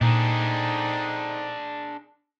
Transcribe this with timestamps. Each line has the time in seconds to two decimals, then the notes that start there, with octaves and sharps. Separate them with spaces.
0.01 A#2 D3 C4 D4 D#4 G#4